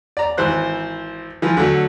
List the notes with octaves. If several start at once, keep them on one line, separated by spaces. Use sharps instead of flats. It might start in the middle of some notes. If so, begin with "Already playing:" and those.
D5 A#5
G#1 E3 C5 F#6
E3 F3
D3 F#3 A3